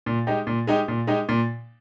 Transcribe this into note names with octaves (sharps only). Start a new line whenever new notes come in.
A#2
G#3 D#4 G4
A#2
G#3 D#4 G4
A#2
G#3 D#4 G4
A#2